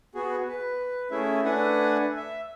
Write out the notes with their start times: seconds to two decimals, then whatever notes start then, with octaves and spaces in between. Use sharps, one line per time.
0.15 B3 F#4 G#4
0.49 B4
1.11 A3 C#4 E4 G#4 E5
1.45 A3 D4 B4 F#5 G#5
2.16 E5